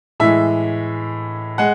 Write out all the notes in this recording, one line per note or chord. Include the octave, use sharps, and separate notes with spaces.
A2 E3 G#3 E5
G#3 F#5